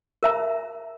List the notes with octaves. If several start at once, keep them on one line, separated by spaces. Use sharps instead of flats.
A#4 E5 A#5